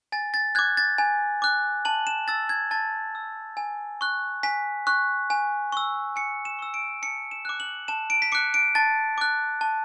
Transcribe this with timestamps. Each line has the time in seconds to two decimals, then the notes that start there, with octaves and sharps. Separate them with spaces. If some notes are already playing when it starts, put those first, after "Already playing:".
0.12 G#5 A6
0.34 A6
0.55 D6 F#6 G#6
0.77 A6
0.98 G#5
1.42 D6 F#6
1.85 A5 F#7
2.07 E7
2.28 E6 A6
2.49 G#6
2.71 A5 A6
3.15 E6
3.57 G#5
4.01 C#6 F#6
4.43 G#5 B6
4.87 C#6 F#6
5.30 G#5
5.72 C#6 E6
6.16 G#5 C#7
6.45 E7
6.59 C#6 E6
6.74 D7
7.02 A5 C#7
7.31 E7
7.45 D6 F#6
7.60 F#7
7.88 A5 E7
8.10 D7
8.22 B6
8.32 D6 F#6 C#7
8.54 D7
8.75 A5 A6
9.18 D6 F#6
9.61 A5